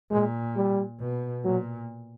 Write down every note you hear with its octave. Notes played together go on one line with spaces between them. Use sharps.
A#2 G#3
G3
B2
A#2 F#3